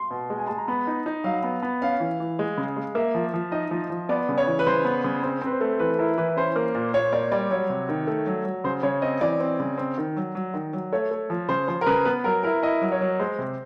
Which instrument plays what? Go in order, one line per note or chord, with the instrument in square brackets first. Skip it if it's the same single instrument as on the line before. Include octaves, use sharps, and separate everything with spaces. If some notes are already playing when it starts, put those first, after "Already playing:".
Already playing: [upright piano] C6
[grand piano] B2
G#3
[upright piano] G#5
[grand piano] G#3 [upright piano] A5
[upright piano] A#5
[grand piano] B3 [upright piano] B5
[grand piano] D#4
D#4
[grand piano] F#3 [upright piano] F5
[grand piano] B3
B3
[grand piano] C#4 [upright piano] F5
[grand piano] E3
E3
G#3
C#3
G#3
[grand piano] A#3 [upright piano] E5
[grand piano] F3
F3
[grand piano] D#4 [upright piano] D#5
[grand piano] F3
F3
[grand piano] B3 [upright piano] D5
[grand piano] C#3
[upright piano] C#5
[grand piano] E3
[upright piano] B4
[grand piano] C#3 [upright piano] C5
[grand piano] B3
C#3
[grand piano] C4 [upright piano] C5
[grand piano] C4 [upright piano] B4
[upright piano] C5
[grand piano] A3
[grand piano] E3 [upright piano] B4
[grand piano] E4 [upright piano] A#4
[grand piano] E3 [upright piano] B4
[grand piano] C#4 [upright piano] C5
[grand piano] A#3
A#2
[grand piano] A#2 [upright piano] C#5
[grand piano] A#3 [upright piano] D5
[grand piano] G3 [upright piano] D5
[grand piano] F#3 [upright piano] C#5
[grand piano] C3
D#3
A3
F#3
F#3
[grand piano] C#3 [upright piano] C5
[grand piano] C#3 [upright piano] C#5
[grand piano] C4 [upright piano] D#5
[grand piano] E3 [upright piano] D5
[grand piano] C4
C#3
C4
D#3
F#3
F#3
D#3
F#3
[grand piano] A3 [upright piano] C#5
[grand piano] A3
F3
[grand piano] C#3 [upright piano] C5
[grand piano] F3 [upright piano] C5
[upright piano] A#4
[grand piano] C#3 [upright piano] B4
[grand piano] B3 [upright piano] B4
[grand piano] F#3 [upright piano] A#4
[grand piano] E4 [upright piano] A#4
[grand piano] E4 [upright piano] D#5
[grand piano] F#3
[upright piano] C#5
[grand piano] F#3
[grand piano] G#3 [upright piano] C5
[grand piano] C3